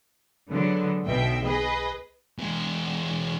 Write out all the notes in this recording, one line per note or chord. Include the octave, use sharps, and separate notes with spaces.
D3 F#3 G#3 B3
B1 B2 E5 G5
G#4 B4 D#5
E2 G#3